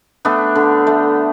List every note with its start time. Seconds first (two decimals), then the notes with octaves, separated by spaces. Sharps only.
0.25 A3 B3 D4
0.55 D3
0.87 A3